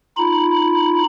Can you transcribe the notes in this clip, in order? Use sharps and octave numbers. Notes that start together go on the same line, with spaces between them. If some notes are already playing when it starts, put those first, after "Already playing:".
D#4 F4 B5